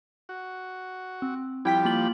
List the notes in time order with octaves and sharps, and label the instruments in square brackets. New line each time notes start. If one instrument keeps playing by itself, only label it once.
[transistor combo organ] F#4
[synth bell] C4
[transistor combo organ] F3 G3 G4 [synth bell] E4 G5 B6
[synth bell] A#3 F4 F#7